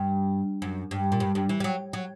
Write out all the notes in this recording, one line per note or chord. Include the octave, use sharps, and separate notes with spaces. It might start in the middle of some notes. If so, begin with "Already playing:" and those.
Already playing: G2
F#2
G2
A#2
G2
G2
E3
G3
F#3
F#3